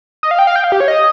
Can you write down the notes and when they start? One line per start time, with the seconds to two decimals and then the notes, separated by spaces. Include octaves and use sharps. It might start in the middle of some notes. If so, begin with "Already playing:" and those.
0.23 D#5
0.31 F5
0.39 G5
0.47 F5
0.56 G5
0.64 F5
0.72 G4
0.80 C#5
0.88 D#5